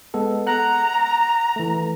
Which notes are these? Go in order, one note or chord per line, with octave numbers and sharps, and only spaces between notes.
G#3 B3 A4
F#5 A#5 F#6
E3 A3